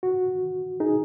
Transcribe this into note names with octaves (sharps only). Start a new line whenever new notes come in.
F#4
D#4 G#4